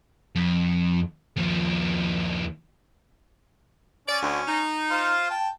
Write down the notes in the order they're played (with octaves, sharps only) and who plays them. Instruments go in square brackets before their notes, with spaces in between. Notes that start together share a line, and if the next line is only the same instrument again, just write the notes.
[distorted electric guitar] F2
D#2 F3
[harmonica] C#4 [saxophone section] D5
[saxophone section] D2
D#4
[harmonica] F4 C5 F5
G5 A5